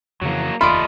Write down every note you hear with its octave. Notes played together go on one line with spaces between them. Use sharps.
F2 C#3 E3 F#3 A#3
F1 D#2 A3 F4 D5 D#5 B5